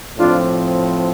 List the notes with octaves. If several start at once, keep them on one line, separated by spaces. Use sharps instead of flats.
A2 F3 C4 D4 F4